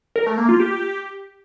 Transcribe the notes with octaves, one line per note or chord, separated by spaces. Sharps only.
A#4
A3
A#3
F4
G4